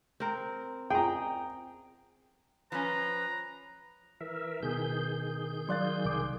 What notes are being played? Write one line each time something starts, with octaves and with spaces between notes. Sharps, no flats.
C4 A#4
G#4 G5 A#5
F3 C#4 B4 A#5
E3 A#4 E5
B2 D#3 G#4 G6
F#3 D5 F5 C6 F#6 A6
C2 D6